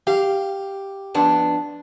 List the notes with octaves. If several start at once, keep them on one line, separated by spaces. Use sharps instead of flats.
G4 F5
F2 B3 D4